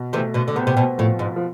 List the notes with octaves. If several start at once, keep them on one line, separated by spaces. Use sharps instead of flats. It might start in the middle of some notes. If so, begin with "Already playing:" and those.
Already playing: B2
C3 E3 A3
B2 D3
D3
C3 B3
C3
B2
A2 F3
G#2
F3